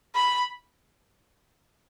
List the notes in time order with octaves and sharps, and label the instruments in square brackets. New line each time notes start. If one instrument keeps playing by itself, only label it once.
[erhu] B5